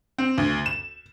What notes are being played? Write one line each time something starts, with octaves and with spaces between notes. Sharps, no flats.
C4
D2
E7